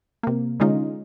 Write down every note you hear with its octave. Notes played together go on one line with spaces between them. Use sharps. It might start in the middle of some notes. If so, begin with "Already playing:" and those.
C3 A#3
D3 G#3 C#4 D#4 F4